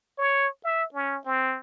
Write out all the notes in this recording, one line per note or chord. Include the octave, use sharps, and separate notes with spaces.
C#5
E5
C#4
C4